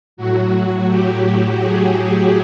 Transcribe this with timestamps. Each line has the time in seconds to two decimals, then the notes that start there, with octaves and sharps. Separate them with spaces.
0.17 A2 F#3 F#4
0.88 G4
1.60 G#4